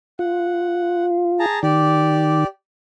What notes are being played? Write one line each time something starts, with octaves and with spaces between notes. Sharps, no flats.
F4 F#5
G#4 A5 A#5
D#3 G4 D5